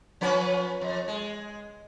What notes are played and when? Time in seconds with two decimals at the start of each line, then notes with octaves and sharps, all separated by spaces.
0.21 F3 C#4 B4
0.81 F2
1.08 G#3